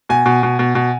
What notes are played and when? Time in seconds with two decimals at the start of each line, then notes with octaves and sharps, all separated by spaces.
0.09 B2 G#5
0.26 B2
0.43 B2
0.59 B2
0.75 B2